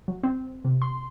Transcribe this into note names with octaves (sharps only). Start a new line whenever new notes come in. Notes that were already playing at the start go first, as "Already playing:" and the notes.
F#3
C4
C3
C6